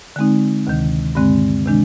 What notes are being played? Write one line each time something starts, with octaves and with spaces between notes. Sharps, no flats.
D3 G#3 C4 D#4
D2 C3 D#3
G2 D3 G#3 C4
C3 D#3 G#3 D4